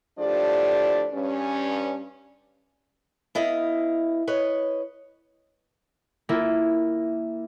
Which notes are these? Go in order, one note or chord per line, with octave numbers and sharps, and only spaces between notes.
A2 F3 D4 G4 D5
G2 C#4
B3 E4 D#5 F5
B4 C#5 D#5
A#3 E4 F4